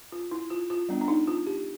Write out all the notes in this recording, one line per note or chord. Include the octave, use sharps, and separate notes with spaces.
F4
E4
F4
F4
G3 B3 D4
D4
D#4
F4
G4